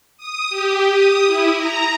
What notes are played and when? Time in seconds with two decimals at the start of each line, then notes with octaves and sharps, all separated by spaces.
0.18 D#6
0.50 G4
0.91 D#6
1.27 E4
1.56 A#5